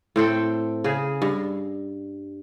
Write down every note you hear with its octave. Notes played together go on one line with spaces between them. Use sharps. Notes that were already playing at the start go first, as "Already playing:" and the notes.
A2 C4 A4 G5
C#3 G#4
G2